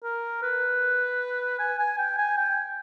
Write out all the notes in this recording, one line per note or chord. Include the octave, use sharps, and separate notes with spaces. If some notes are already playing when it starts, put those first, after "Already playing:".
A#4
B4
G#5
G#5
G5
G#5
G5